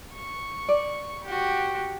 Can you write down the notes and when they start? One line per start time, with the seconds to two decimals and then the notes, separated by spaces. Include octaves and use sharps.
0.14 C#6
0.69 D5
1.24 F#4 G4